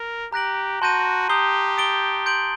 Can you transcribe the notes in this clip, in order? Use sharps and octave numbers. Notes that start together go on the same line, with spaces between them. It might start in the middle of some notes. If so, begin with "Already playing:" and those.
Already playing: A#4
G4 A#5 F#6 A#6 D7 F#7
F#4 A5 C6 G6 A#6 D#7
G4 A#5 D#6 G6 C7 G7
D#6 A6 D7 G7
C6 G6 D7 F#7